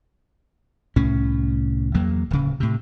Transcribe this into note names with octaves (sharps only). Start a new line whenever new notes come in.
C2 A2 C#4
E2 F#3 A#3
D1 C#3
A2 C3